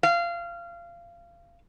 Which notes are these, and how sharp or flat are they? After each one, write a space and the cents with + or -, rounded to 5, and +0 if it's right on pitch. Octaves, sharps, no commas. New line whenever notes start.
F5 -25